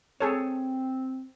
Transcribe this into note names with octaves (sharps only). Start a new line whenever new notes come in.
C4 G#4 A4 C#5